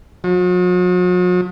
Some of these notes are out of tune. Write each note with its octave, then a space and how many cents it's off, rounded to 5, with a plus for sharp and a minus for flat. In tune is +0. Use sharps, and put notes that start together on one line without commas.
F#3 -45